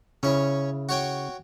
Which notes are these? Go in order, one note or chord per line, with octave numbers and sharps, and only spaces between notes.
C#3 C#4 E4 C#5
F#4 C#5 G5